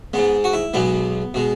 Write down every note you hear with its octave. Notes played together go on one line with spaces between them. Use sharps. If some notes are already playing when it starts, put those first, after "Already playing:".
G#2 G#3 B3
F#4
E4
B1 B2 G#3 B3
B2 G#3